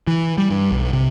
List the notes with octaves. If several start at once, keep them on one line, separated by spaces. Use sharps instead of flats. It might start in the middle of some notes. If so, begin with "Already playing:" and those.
E3
G3
G2
B1
C3